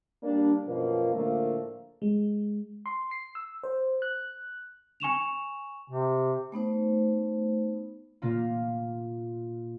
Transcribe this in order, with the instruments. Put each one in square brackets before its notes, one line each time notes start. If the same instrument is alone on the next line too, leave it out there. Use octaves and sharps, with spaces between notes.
[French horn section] G3 A#3 D4
F#2 B2 F3 A#3 F4
A2 D3 F3 A3 A#3
[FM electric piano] G#3
C6
C7
E6
C5
F#6
[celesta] G#5 C#6 E7 F7
[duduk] C3
[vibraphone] A3 B3 D#4 C5
[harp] A#2 A#3 F4